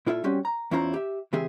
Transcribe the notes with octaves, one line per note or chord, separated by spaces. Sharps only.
A#2 E4 F4 A4 D5 E5
G3 C4 C#4 F#4 G4
A#5
E2 C#4 E4 F4 C5 A#5
G4 E5
C#2 E3 C4 G4 G#4 E5